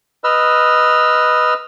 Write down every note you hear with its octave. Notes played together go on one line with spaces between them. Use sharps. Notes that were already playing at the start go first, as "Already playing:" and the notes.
B4 D#5 E6 F6